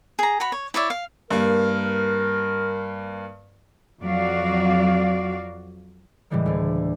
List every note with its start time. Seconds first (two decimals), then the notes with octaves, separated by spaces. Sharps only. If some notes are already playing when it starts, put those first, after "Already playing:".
0.19 G#4 A#5
0.40 F#4 C#5 B5
0.52 C#5
0.74 E4 C#5 D5 E5
0.90 F5
1.31 G2 A#3 A#4
4.01 F2 F#3 F#4 D5 F5
6.30 A2 C#3 E3 G3 G#3 A#3
6.46 D2 D3